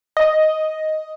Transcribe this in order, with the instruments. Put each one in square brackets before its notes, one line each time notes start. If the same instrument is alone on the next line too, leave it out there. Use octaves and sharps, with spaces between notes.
[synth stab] D#5